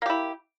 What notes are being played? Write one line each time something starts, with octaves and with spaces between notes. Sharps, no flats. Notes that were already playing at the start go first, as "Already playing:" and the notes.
A#3 E4 G4